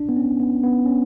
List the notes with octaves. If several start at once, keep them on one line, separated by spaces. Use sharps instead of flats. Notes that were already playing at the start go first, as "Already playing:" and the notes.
Already playing: D4
B3
C#4
B3
B3
C#4